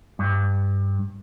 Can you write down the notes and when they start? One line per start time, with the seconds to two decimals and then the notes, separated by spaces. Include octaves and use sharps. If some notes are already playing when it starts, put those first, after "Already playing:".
0.19 G2